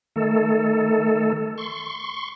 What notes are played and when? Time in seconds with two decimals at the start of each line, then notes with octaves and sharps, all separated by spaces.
0.16 D#3 A3 A4
1.58 C6 C#6